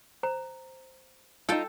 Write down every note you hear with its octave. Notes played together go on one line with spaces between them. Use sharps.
C5 A#5
D#4 F4 A4 G5 A5